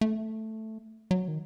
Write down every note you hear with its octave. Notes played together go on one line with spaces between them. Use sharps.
A3
F#3
D#3